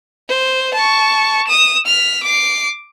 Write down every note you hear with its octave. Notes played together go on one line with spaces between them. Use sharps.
C5
A5 C#6
D#6 E7
F6 B6
D6 C7